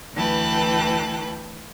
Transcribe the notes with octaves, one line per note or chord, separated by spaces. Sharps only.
D2 E3 B4 G5 A5 F#6